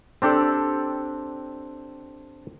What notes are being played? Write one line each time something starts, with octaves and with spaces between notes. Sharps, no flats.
C4 D4 G4 A4 D5